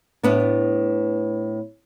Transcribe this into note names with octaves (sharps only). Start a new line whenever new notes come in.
A2 B3 D4